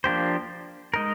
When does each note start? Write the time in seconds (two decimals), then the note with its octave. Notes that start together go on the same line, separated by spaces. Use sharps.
0.04 F3 A#3 D4 G4 C5
0.94 G#3 D#4 A#4